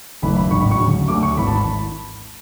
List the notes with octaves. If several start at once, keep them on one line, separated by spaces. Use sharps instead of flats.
F#1 F#2 E3 A3 B5
B5
A1 G#2 F#3 C#6
B5
C#6
D2 C#3 F#3
D2 D3 F#3 A3 D6
C#6
G#1 G#2 E3 B5
A5
B5